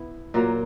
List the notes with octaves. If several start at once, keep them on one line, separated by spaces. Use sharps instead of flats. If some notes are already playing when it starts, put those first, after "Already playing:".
Already playing: B3 E4
A#2 F#3 A#3